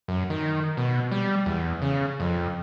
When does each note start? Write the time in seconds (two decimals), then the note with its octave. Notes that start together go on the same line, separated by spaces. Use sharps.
0.08 F#2
0.30 D#3
0.77 B2
1.11 G3
1.46 E2
1.82 C#3
2.20 F2